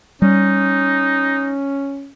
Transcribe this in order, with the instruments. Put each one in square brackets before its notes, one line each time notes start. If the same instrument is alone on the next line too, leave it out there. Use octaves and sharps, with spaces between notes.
[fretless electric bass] G3 [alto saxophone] C#4 [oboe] D#4